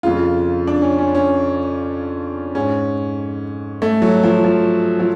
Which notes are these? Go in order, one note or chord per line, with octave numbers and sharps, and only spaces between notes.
F2 C#3 F4
D4
C#4
C#4
C#4
G#2 C#4
A3
F#3
F3
F3
F3